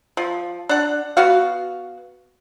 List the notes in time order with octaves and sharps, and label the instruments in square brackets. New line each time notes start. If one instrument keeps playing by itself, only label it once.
[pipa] F3
D4 F#5
B3 F#4 F5